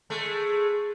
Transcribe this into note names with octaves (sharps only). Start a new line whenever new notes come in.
G#3 A3